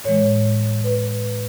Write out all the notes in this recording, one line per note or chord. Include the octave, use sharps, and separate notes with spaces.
A2 E3 G#3 C#5
B4